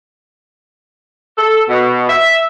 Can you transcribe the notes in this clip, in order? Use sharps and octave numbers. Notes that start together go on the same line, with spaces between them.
A4
B2
E5